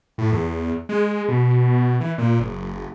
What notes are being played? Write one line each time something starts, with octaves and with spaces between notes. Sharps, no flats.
A2
E2
G#3
B2
E3
A#2
F#1